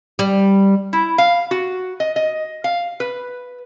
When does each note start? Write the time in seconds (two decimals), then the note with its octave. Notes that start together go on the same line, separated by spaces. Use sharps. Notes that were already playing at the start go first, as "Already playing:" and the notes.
0.19 G3
0.93 E4
1.18 F5
1.51 F#4
2.00 D#5
2.16 D#5
2.64 F5
3.00 B4